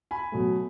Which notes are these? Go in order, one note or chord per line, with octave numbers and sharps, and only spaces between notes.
G#5 B5
B2 F#3 A3